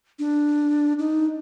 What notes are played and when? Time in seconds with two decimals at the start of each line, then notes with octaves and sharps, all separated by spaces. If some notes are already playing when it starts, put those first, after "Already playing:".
0.19 D4
0.99 D#4